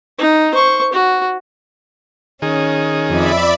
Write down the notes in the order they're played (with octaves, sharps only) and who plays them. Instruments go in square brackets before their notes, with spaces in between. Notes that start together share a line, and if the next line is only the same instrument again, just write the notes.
[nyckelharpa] D#4
C5 C#6
F#4
[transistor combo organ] D#3 G#4 [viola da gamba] C#4
[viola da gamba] F2 [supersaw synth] D5 E5 B5